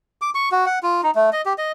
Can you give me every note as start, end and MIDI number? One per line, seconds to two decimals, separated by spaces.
0.22 0.30 86
0.35 0.49 85
0.52 0.65 66
0.66 0.79 78
0.83 1.01 65
1.03 1.11 63
1.15 1.30 57
1.33 1.42 75
1.46 1.53 67
1.58 1.72 75